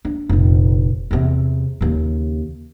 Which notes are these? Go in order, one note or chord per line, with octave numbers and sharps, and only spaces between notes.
D4
F1 A#1
E2 C3
D#2 C#3